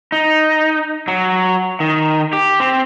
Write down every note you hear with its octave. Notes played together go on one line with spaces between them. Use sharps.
D#4
F#3
D#3
G4
C4